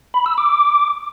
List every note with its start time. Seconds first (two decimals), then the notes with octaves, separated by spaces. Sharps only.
0.14 B5
0.26 E6
0.38 D6